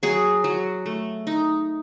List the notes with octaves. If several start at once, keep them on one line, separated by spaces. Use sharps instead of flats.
F#3 G#4
F#3
A3
D#4